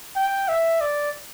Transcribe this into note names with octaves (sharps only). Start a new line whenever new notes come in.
G5
E5
D5